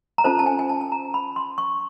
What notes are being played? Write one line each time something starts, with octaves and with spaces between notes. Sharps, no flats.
A#5
C#4 F4 A4 C5 A5
A5
G#5
G#5
A5
A5
A#5
B5
C6
C#6